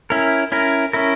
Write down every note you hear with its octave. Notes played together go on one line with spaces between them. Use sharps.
C#4 E4 A#4
C#4 E4 A#4
C#4 E4 A#4